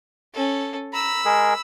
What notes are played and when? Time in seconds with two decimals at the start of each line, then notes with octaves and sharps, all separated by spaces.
0.34 C#4 A4
0.93 A#5 B5 E6
1.25 G#3 G#4 A#4